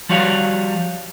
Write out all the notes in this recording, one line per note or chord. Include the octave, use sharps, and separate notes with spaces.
F3 G3 F#4 C#5 F5